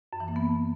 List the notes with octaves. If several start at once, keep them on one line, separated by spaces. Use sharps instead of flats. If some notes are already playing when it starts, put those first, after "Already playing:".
F#2
E3
A#3
B3